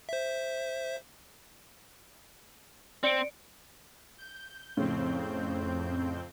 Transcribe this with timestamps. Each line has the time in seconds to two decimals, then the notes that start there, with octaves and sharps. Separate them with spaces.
0.09 C5 E5
3.03 C4 D5 C#7 D7
4.18 G6
4.77 F2 A2 C#3 C4 G6